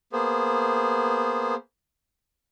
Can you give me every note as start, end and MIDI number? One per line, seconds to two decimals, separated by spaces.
0.13 1.55 58
0.13 1.55 59
0.13 1.55 68
0.13 1.55 72